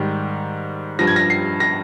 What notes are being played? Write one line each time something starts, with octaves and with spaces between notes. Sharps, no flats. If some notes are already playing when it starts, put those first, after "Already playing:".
Already playing: G#2 D#3 G3
G2 F3 A#6
G#6
A#6
C7
A#6